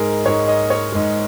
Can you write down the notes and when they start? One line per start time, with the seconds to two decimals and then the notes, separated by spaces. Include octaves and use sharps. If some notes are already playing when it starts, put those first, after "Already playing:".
Already playing: G#2 G#3 G#4 A#4
0.25 G#2 G#3 C#5
0.48 D#5
0.70 C#5
0.92 G#2 G#3